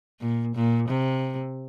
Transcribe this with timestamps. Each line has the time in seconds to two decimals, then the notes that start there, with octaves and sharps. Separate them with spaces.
0.21 A#2
0.55 A#2
0.89 C3